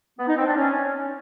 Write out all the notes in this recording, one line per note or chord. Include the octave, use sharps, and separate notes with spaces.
B3
D#4
C4
D4
C#4